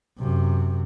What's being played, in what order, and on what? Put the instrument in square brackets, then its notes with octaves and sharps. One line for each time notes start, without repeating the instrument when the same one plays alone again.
[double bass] F#2 C3